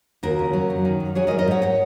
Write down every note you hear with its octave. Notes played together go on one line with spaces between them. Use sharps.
D#2 F#4 A#4
C#3
F#3
F#2
D#3
F#2
F#3 G#4 C#5
A#4 D#5
G#2
A#4 D#5
G#2 C#5 F#5
C#5 F#5